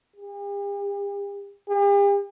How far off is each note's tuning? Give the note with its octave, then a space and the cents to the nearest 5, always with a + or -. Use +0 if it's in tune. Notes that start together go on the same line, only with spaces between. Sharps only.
G4 +45
G4 +45